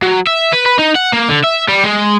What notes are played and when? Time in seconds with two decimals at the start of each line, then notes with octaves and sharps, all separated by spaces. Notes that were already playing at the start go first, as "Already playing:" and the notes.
0.02 F#3
0.27 E5
0.53 B4
0.66 B4
0.79 D#4
0.95 F#5
1.13 A#3
1.29 D3
1.44 E5
1.69 G3
1.84 G#3